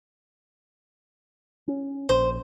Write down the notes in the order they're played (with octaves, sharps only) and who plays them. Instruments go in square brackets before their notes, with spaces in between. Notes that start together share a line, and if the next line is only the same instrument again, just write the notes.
[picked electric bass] C#4
[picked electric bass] A#1 [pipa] C5